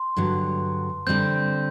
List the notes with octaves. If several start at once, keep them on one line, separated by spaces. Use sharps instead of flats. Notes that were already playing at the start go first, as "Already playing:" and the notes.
Already playing: C6
G2 D3 F#3
D3 G3 C4 G6